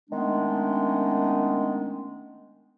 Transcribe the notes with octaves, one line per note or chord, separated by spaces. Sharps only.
D#3 G#3 A3 B3 C#4 D4